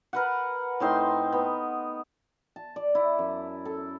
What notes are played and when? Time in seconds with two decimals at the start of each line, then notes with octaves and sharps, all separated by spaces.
0.13 A#4 B4 F#5
0.80 A2 C4 D#4 C6
1.32 B3
2.56 A5
2.76 D5
2.95 E4
3.19 F#2
3.65 A4